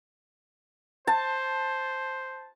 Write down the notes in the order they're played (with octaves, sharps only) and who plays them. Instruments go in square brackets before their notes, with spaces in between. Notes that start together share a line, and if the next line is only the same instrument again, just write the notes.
[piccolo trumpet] C5 [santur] A5